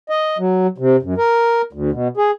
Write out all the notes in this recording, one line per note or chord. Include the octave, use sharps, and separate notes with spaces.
D#5
F#3
C3
F#2
A#4
D2
B2
G#4